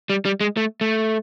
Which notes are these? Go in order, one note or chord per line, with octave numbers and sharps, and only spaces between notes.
G3
G3
G#3
A3
A3